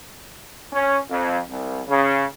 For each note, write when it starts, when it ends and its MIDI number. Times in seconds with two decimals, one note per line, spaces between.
0.71 0.99 61
1.10 1.37 41
1.49 1.80 36
1.87 2.24 49